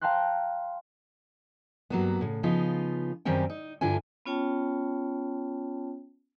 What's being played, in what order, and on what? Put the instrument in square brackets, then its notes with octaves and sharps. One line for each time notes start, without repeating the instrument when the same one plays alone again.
[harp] F5 G5 A5 A#5 C6 F#6
[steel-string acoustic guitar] G2 F#3 A#3 B3
A2 C#3
C#3 F3 B3 D#4 F4
F#2 D#3 G3 C4 C#4 G5
D#4
G2 D3 D4 E4 F4 G#5
[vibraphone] B3 C#4 F4 C#5 G5 A5